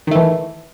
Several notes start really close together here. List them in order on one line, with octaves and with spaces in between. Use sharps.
D#3 A3 E3